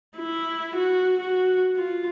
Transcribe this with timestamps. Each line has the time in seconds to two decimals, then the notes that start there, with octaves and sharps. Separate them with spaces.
0.17 E4
0.76 F#4
1.20 F#4
1.76 F4